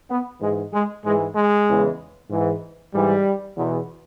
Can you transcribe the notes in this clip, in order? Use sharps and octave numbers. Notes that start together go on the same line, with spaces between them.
B3
G#2 E3 G#3
G#3
G#2 E3 G#3
G#3
E2 C#3 E3
G#2 E3
G#2 E3 G3
E2 B2